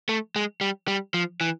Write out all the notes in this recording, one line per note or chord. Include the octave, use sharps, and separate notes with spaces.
A3
G#3
G3
G3
F3
E3